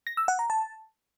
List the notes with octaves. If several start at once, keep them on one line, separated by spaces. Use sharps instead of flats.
A#6
E6
F#5
A#5
A5